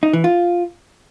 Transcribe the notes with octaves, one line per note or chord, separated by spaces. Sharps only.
D#4
E3
F4